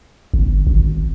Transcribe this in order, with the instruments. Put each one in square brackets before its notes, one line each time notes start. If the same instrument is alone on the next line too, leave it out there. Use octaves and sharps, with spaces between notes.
[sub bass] G1
G#1